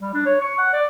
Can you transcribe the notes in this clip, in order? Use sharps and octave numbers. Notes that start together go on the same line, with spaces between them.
G3
D4
C#5
C#6
F#5
D5